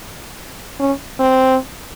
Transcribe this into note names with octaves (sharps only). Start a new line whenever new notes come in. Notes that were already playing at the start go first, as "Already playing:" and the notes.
C#4
C4